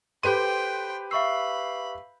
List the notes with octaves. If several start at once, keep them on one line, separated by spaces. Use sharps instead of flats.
G4 A4 B4 C5 G5 C6 D#7
E5 F5 B5 C#6 E6 C7